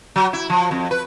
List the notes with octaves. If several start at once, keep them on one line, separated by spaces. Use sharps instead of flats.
F#3
E4
F3
F2
B4